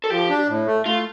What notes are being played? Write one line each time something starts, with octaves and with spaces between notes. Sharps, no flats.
A4
F3 G4
D4
A2
A3
A3 F4